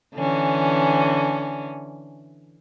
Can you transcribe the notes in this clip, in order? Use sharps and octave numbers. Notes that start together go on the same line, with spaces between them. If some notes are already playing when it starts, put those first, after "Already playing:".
D3 E3 C#4